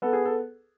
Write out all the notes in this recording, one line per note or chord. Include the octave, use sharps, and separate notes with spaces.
B3 A4
G#4
A4